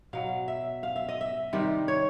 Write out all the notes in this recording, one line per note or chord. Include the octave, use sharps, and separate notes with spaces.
B2 F#3 F5
E5
F5
E5
D#5
E5
C3 D#3 G3 D5
C#5